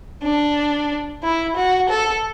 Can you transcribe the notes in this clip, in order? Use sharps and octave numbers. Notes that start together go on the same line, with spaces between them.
D4
E4
F#4
A4